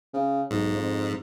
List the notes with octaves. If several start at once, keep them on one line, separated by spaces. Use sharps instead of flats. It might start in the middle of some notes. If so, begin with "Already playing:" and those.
C#3
B1 G#2
F2